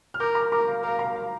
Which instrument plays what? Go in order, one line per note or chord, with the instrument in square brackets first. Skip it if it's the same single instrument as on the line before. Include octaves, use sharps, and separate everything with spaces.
[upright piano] F6
[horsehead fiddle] A#4 [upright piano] D6 G6
[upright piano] A#5 D6
[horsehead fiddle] A#4 [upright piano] A#5 D6
[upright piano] F5
[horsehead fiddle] A#4 [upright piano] F5
[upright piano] F5 A#5
F5